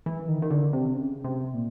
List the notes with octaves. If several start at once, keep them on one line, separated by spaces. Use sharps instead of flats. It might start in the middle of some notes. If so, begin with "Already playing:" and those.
E3
D#3
D#3
D3
C3
C#3
C3
A#2